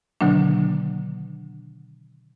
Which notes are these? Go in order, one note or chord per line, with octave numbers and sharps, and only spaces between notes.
B2 D3 D#3 F#3 A#3 D4